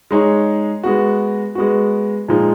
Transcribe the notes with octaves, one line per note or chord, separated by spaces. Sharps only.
G#3 D#4 G#4 C#5
G#3 B3 F#4
G#3 B3 F#4
A#2 F3 G#3 D#4